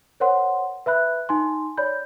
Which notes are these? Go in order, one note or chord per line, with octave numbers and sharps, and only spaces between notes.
A#4 C5 C#5 F#5 C6
B4 E5 B5 F#6
D#4 G#5 C6
C#5 D5 B5 G6